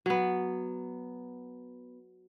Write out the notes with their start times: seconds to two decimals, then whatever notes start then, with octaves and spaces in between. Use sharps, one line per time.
0.06 F#3 B3